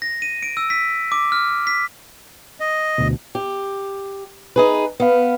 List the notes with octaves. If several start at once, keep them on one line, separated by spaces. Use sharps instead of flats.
A#6
D#7
D7
E6
B6
D6
F6
B6
D#5
D2 B2
G4
D#4 G#4 B4
B3 B4 F5